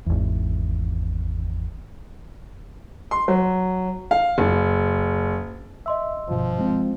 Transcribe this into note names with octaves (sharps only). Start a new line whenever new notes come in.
G#1 E2
C6
F#3
F5
F#1
D#5 E5 C6 E6
G#1 G2 B2 F3
G#3 C4